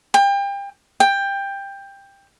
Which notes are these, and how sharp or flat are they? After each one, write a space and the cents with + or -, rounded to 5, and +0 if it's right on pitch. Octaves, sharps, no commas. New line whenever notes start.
G5 +30
G5 +15